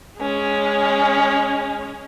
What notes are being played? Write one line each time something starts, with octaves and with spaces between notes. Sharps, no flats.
G#3 C#4